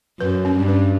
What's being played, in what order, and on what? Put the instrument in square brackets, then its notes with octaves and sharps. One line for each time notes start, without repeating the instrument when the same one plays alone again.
[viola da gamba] F#2 [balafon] B4
[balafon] C#4
[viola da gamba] G2
[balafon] B4